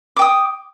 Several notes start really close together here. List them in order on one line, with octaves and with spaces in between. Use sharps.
D6 G5 D#6